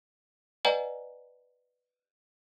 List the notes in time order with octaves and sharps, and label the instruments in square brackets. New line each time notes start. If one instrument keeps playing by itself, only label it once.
[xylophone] B4 D5 D#5 F#5 G#5 A#5